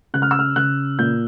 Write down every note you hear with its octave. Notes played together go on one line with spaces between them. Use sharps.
C#3 F#6
F6
E6
F6
C#3 F#6
A#2 G6